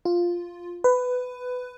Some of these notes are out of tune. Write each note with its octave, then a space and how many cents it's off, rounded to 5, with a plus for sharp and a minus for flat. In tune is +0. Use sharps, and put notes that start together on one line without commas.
F4 +0
B4 +15